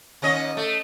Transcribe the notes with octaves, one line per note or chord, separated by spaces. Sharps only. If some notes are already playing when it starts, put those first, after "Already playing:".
D#2 C#4 D#5
A3